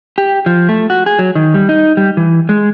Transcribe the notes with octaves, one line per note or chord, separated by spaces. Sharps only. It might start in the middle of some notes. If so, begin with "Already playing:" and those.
G4
F3
A3
F#4
G#4
F#3
D#3
G3
D#4
G3
E3
G#3